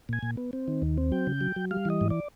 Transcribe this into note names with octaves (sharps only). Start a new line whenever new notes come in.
A#2 G#5
A#2
B3
C4
D#3
D#2
C4
F#3 G5
C#3
F#3
F#3
G3 F5
E3 D#5
G#2
D5